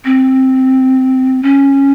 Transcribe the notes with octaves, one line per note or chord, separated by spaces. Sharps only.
C4
C#4